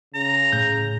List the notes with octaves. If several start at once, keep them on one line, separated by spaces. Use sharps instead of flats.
C#3 A#5
A2 G6